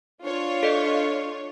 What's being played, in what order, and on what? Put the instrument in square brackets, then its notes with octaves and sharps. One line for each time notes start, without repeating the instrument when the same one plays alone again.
[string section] D4 F4 C#5
[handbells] A4 D5 D#5